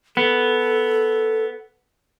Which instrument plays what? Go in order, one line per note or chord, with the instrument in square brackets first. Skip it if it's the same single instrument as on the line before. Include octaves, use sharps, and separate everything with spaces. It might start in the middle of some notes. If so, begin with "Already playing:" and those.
[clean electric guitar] B3 [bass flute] A4